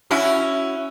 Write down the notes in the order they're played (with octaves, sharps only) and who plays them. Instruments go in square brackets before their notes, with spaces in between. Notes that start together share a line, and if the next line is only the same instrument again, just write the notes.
[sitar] C#4 E4 F#4